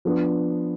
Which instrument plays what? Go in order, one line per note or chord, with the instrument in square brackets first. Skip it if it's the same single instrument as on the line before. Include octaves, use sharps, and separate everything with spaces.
[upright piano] F3 B3 D4